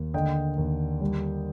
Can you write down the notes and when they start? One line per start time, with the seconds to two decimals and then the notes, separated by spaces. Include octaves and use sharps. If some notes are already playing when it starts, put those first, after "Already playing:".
Already playing: D#2
0.14 D3 D#5 G5
0.58 D#2
1.01 G3